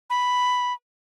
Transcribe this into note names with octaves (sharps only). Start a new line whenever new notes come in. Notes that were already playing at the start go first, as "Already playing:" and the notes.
B5